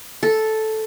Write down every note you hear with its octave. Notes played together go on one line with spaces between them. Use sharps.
A4